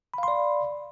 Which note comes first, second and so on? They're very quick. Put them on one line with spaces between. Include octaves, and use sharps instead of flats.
B5 F5 C6 D5